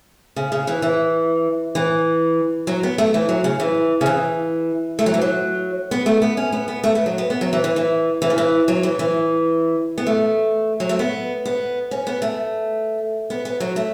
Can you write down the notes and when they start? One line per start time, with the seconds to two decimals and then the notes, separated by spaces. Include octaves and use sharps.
0.36 C#3
0.52 C#3
0.67 E3
0.82 E3
1.75 E3
2.67 F#3
2.83 B3
2.98 A3
3.14 E3
3.29 F#3
3.44 C#3
3.60 E3
4.01 C#3
4.06 E3
4.99 A3
5.06 F#3
5.14 E3
5.22 F#3
5.91 B3
6.06 A3
6.22 B3
6.37 C#4
6.52 B3
6.68 B3
6.84 A3
6.95 B3
7.06 F#3
7.18 B3
7.30 B3
7.41 F#3
7.53 E3
7.64 E3
7.76 E3
8.22 E3
8.30 C#3
8.38 E3
8.68 F#3
8.83 E3
8.99 E3
9.98 B3
10.07 A3
10.80 F#3
10.89 A3
10.99 B3
11.46 B3
11.91 C#4
12.07 B3
12.22 A3
13.30 B3
13.45 B3
13.60 F#3
13.76 A3